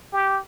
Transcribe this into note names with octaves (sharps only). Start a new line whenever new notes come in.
G4